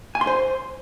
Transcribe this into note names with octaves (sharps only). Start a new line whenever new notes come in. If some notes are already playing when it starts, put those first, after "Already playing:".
G#5
C6
C5